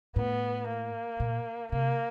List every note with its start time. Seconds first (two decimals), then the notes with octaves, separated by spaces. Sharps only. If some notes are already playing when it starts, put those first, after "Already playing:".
0.16 A2 B3
0.68 A#3
1.20 A#2
1.72 C3 A#3